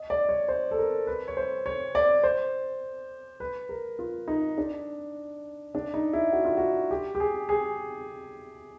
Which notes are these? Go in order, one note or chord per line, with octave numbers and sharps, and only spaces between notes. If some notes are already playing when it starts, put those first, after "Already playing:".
Already playing: D#5
D5
C#5
C5
A4
A#4
B4
C#5
C5
C#5
D5
C5
B4
A#4
F4
D#4
D4
D4
D#4
E4
F#4
F4
F#4
G4
G4
G#4
G#4